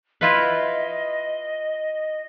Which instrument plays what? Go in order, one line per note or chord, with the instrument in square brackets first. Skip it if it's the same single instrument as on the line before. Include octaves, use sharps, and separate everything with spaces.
[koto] E4 F4 B4 [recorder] D#5